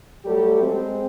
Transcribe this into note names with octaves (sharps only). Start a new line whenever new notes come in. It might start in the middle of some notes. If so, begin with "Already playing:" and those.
F#3 G3 A3 G4 A4
G#3 C4